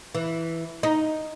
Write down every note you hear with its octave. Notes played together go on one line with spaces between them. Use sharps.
E3
D#4